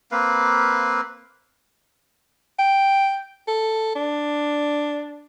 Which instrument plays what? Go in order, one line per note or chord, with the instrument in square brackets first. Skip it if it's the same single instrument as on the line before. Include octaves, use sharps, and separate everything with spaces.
[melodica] A#3 C4 B4 F5
[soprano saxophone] G5
A4
D4